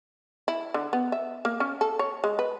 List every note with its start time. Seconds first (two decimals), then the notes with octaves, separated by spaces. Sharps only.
0.48 E4
0.74 D3
0.93 B3
1.12 E5
1.45 A#3
1.60 C#4
1.81 A4
1.99 C#5
2.24 G#3
2.39 B4